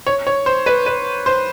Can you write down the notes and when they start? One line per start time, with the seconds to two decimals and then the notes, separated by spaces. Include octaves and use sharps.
0.07 C#5
0.27 C#5
0.46 C5
0.66 B4
0.86 B4
1.26 C5